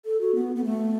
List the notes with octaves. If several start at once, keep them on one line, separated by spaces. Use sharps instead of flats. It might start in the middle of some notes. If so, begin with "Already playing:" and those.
A4
F#4
B3
B3
A3